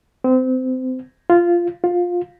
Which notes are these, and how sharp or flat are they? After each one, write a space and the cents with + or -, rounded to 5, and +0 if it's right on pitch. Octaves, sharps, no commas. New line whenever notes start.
C4 -25
F4 -10
F4 +15